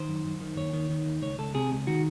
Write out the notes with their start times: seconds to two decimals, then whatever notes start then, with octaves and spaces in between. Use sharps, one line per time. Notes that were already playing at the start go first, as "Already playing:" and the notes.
Already playing: D#3 C5
0.08 F#2
0.25 F#2
0.41 D#3
0.57 D#2 C#5
0.73 D#3
0.90 D#3
1.06 D#2
1.22 C#2 C#5
1.39 C#2 A4
1.55 C3 G#4
1.72 C#2
1.87 D#3 F#4